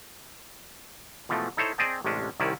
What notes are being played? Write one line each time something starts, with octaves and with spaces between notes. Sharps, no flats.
B2 E3 F3 G#3 A3
D#4 E4 A4 C5 C#5
C4 G#4 D5 D#5 G5 A5
A1 C3 G#3 C#4 D4
C2 C3 D#3 C#4 E4 D5